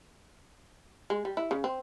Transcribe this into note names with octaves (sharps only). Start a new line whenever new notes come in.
G#3
G3
E4
C#3
C4